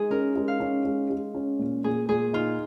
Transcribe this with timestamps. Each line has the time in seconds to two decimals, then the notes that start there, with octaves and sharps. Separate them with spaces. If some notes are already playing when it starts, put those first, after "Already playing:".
Already playing: G#3 D#4 G#4
0.11 C#4 A#4
0.36 G#3
0.48 F5
0.60 C#4
0.85 G#3
1.10 G#3
1.35 C#4
1.59 A#2
1.84 A#2 G#4
2.09 A#2 G#4
2.33 D#4 F4